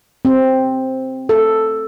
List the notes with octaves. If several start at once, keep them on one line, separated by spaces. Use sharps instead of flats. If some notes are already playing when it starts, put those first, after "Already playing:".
C4
A4